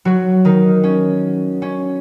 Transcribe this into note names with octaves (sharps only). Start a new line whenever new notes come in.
F#3 F#4
D#3 D#4
C#4
C#4